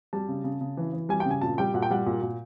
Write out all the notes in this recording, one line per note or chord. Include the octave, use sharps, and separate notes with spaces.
G3 A5
C#3
C#3
C#3
E3
E3
G3 G#5
G5
C#3
G#5
A#2 A5
G3 G5
A#2 F#5
G5
G3 F#5
A#2
A#2